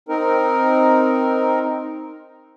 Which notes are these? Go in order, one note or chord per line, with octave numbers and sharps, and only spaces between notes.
C4 D#4 A#4